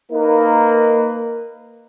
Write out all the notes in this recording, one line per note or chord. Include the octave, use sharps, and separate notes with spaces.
A#3 D#4 A#4 B4